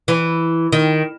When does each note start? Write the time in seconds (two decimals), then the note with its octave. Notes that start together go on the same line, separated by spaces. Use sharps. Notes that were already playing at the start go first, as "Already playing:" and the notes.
0.08 E3
0.72 D#3